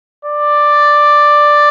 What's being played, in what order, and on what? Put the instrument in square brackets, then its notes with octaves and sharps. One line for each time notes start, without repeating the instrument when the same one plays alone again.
[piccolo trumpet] D5